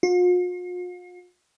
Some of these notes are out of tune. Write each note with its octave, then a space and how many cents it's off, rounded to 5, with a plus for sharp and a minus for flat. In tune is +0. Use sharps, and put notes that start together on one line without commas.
F4 +45